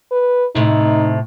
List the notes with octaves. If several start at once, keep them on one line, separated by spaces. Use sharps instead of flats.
B4
A2 C3 D#4